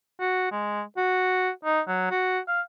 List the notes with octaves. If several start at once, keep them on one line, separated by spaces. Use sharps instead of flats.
F#4
G#3
F#4
D#4
F#3
F#4
F5